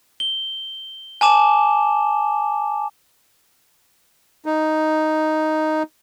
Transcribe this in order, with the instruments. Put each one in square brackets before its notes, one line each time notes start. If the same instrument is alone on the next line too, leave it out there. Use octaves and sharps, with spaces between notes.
[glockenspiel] G7
G#5 A5 D6 E7
[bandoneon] D#4